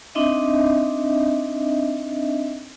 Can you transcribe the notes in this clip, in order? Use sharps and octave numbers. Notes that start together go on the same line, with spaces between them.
C4 D4 D#4 D#5 E5